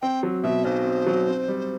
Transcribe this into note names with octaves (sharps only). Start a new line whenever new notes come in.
C4 G5
F#3
B2 E5
B1 C5
C4
F#3
C4
G3